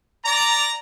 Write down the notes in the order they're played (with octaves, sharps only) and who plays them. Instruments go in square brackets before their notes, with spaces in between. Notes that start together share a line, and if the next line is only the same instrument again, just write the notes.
[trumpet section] D5 A#5